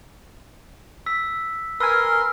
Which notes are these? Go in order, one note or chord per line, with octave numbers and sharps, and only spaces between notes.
E6 B6
A#4 B4 G#5 C6 E6 F6